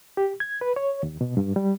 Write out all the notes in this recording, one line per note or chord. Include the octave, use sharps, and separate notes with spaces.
G4
G#6
B4
C#5
D#2
B2
G2
G3